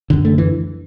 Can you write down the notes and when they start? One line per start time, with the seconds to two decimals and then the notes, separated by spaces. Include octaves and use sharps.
0.10 F#2 D3
0.25 A3
0.38 E3